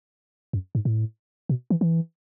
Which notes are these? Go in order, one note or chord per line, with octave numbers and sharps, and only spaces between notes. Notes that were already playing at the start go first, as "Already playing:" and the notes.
F#2
G#2
A2
B2
E3
E3